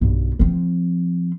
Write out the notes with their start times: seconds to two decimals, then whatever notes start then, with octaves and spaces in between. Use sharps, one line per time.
0.01 B1 G2
0.39 F3 C4